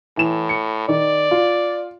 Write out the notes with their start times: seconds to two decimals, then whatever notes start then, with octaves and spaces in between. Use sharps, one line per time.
0.17 A2 E3 E7
0.49 C#7
0.89 D#3 D5
1.31 F4